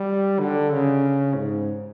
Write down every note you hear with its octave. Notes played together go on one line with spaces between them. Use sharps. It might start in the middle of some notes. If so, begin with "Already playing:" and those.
Already playing: G3
D3
C#3
G#2